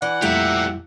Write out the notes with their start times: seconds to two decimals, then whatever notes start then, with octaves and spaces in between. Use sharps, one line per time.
0.02 E3 D5 F#5
0.22 F2 A#2 G3 A3 E4 G4 E5